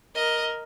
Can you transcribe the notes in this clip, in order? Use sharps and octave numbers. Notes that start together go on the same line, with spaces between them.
A#4 D#5